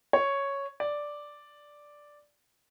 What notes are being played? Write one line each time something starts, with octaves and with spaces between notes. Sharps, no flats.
C#5
D5